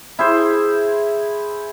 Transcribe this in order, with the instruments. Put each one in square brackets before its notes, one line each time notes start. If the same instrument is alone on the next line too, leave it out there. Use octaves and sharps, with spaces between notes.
[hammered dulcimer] E4 G#4 C5